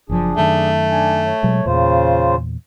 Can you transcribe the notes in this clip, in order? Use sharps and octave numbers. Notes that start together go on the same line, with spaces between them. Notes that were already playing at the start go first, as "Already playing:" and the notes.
F#1 F#2 F3 D4 G#4
F#2 D#3 A3
D4 G#5
C#5
B2 F#3 G#3
E2 A#2 C#3 F4 C5